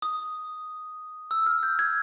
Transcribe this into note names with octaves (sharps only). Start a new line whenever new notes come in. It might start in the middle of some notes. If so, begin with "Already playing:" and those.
D#6
E6
F6
G6
G#6